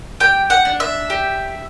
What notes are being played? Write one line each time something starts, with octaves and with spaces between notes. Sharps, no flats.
G4 G5
F#5
D4
E5
G4